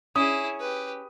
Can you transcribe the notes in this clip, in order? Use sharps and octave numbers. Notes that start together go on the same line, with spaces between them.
C#4 E4 G#4 D#6
G4 B4